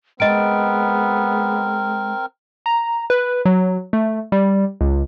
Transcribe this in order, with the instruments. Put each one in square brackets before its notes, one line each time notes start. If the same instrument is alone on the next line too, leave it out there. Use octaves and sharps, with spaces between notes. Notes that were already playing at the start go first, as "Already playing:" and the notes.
[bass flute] G#3 [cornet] B3 [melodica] C4 A#4 [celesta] D#5 D7
[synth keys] A#5
B4
F#3
A3
G3
C#2